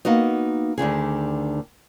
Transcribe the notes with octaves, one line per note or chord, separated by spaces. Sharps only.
A#3 B3 D#4 F#4 D#5
D2 D3 D#3 G#4